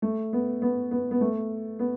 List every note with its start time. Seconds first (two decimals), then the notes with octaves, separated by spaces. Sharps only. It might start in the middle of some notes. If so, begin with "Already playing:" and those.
0.02 A3
0.33 B3
0.62 B3
0.91 B3
1.11 B3
1.21 A3
1.79 B3